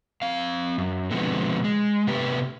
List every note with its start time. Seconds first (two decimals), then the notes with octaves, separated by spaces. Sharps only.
0.22 C4 F5
0.78 F#2
1.11 B2 D3 F3 G#3 B3 C4
1.64 G#3
2.07 C3 A3 B3 G4 B4